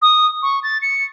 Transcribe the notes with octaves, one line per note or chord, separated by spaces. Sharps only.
D#6
C#6
A6
C#7